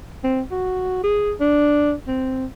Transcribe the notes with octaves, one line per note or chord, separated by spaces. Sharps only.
C4
F#4
G#4
D4
C4